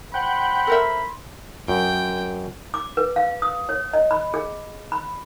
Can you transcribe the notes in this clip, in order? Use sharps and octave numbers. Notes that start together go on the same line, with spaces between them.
C5 F#5 G5 B5 C6
A4 A#4 E5
F#2 G5
D6
B4
F5
D#6
C#5
D#5
B5
G#4
B5